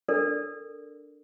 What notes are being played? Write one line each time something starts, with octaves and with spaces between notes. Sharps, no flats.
D4 A4 A#4 D5